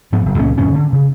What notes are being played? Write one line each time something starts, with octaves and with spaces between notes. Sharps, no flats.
G#2 F3 B3
F#1
C#2 A#2 A#3 C#4
F2 A2 C#3 C#4
D3
C#3